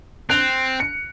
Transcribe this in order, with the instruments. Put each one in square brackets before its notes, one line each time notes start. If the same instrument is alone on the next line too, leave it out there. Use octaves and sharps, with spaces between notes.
[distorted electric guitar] C4 [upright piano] F#6 D7 F7
[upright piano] C#7